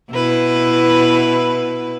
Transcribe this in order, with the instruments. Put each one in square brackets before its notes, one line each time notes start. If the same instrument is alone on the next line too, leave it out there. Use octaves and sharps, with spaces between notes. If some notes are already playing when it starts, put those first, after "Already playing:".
[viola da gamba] B2 E4 B4